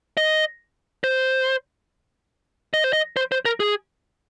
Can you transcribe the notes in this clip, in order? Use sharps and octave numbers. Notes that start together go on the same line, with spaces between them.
D#5
C5
D#5
C5
D#5
C5
C5
A#4
G#4